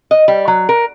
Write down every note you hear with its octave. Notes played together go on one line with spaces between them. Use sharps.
D#5
G3
F#3
A#4